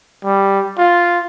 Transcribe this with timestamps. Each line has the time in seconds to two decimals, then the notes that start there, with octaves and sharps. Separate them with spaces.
0.25 G3
0.78 F4